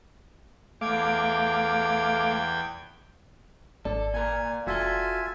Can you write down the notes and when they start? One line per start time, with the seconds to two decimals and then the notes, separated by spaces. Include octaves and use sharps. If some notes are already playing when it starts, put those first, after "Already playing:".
0.81 E2 A3 F5 G5 D6 G#6
3.85 G#1 A4 D5
4.14 A#2 A#4 G#5
4.67 F1 F4 F#4 A4 E5 G#5